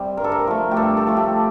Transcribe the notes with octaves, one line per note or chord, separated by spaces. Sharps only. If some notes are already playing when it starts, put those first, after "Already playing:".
Already playing: C3 G3 C5
G2 A#4
A4
A#4
F3 A3
G4
G2 A4
A4
F3 A3
G4